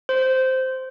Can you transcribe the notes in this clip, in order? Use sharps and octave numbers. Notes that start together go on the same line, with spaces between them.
C5